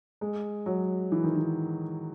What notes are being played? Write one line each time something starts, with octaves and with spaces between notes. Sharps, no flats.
G#3
F#3
E3
D#3
E3